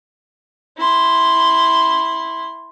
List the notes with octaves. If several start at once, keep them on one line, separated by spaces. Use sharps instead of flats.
E4 C6